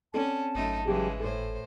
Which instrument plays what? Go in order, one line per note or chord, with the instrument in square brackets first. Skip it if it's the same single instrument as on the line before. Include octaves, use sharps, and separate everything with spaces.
[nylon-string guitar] C4 A4 D5 [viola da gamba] C#4 [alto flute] A5
[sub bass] G#1 [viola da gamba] F#2 A3 D#4
[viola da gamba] C#3 E3 G#3 [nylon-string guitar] F#3 G4 G#4
[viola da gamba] A2 C5 [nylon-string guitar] A4 C#5